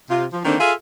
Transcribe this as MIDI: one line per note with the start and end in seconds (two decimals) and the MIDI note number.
0.09 0.24 48
0.09 0.24 65
0.31 0.41 53
0.45 0.55 50
0.45 0.55 51
0.45 0.55 55
0.45 0.55 58
0.45 0.55 60
0.45 0.55 62
0.59 0.72 65
0.59 0.72 68
0.59 0.72 69
0.59 0.72 76
0.59 0.72 77